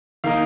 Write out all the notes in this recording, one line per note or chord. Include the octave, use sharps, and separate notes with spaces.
D#3 A#3 D#4 F5